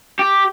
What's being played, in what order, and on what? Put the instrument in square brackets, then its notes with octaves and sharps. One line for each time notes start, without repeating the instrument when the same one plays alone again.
[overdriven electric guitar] G4